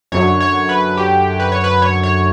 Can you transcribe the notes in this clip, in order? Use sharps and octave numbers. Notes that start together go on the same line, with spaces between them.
F#2 D3 F#3 C#5
C#5
B4
G4
B4
C#5
B4
C#5
C#5